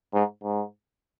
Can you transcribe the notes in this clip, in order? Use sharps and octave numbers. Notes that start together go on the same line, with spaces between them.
G#2
G#2